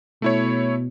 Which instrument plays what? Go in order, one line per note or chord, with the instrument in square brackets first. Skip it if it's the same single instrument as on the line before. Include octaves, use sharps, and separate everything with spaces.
[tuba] B2 [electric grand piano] A3 E4 C#5